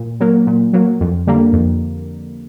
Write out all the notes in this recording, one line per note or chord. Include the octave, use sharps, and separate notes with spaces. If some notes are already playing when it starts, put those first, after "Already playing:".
Already playing: A#2
F#3 A#3
A#2
F#3 A#3
F2
D3 G3 A#3
F2